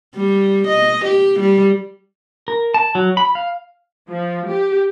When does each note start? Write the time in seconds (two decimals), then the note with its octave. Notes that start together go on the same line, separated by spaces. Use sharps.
0.16 G3
0.68 D#5
1.05 G4
1.40 G3
2.48 A#4
2.74 A5
2.95 F#3
3.17 B5
3.35 F5
4.10 F3
4.50 G4